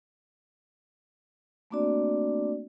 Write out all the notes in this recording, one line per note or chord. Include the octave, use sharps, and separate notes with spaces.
A3 A#3 C4 D4 F#4 D5